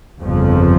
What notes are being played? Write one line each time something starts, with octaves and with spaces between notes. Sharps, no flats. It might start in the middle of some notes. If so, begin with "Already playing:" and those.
G1 F2 C#3 F3